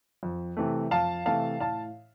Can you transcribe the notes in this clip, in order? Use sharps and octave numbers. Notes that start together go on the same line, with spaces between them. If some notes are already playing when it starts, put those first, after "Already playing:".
F2
C3 E3 A3
F2 F5 A5
C3 E3 A3 F5 A5
A2 F5 A5